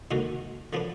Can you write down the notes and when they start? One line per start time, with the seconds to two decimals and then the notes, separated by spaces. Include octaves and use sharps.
0.11 D#2 D3 G#3 D#4 F#4
0.73 D3 F3 B3 D4